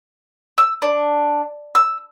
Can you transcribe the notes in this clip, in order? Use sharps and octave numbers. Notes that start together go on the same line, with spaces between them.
E6
D4
E6